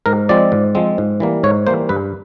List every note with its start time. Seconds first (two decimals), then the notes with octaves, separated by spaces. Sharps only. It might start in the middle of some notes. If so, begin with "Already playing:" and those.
0.06 G#2 A#4
0.29 F3 G#3 C4 D5
0.52 G#2
0.75 F3 G#3 C4
0.98 G#2
1.20 E3 G3 A#3
1.43 G#2 C#5
1.67 E3 G3 A#3 C5
1.89 G2 B4